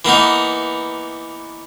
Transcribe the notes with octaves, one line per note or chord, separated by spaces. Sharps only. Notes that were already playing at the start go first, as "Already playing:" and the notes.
E3 A#3 B3 D#4